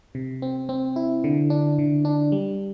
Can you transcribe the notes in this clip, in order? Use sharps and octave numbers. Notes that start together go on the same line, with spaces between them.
C3
C4
C4
E4
D3
D4
D3
D4
G3